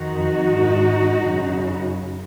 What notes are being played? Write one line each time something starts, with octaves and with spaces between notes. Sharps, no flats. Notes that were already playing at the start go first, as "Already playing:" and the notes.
Already playing: F2 D#3 D#4 F#4
G#2 D#3
F#2 C#3